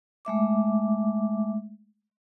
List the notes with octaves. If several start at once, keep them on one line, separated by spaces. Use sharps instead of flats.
G#3 A3 E5 D6